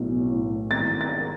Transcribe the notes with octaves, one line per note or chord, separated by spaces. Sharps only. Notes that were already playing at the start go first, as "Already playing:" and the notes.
Already playing: B1 A2
A2
G#1 A6
A6